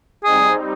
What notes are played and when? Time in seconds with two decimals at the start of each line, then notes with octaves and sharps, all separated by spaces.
0.24 G3 C4 D#4 G#4